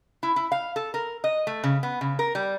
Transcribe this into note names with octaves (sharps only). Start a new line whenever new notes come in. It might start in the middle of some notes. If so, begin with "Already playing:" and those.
E4
E4
F5
A4
A#4
D#5
A3
C#3
B3
C#3
A#4
G3